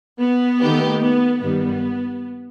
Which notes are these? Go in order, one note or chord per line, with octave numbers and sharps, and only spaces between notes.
B3
D#3 A3 D#4 G4 B4
B3
G2 D#3 G3 B3